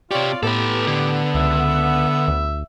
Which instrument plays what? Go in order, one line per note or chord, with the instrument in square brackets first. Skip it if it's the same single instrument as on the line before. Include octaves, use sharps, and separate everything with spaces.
[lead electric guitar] C3 G4 [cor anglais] F4 [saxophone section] C#5 D5
[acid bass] A2 [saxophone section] B3 [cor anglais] G4 [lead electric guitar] A4 B4
[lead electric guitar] D3
[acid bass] C#2 [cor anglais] E5
[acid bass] D2